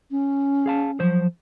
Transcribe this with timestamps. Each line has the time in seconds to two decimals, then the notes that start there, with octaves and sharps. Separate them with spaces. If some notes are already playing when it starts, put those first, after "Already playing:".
0.11 C#4
0.66 G#4 F5 A5
1.00 F3 F#3 C5